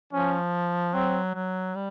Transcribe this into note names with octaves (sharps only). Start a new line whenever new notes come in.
F3 C#4
F#3 C4
F#3
G3